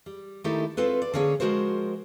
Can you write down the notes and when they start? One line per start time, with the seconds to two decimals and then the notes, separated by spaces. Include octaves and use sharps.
0.06 G3
0.44 D#3 A3 D#4 E4 G4 A4
0.77 C4 F4 A4 B4
1.02 D5
1.14 D3 A#3 C#4 G#4 C#5
1.40 F3 F#3 G#3 F#4 A#4 C5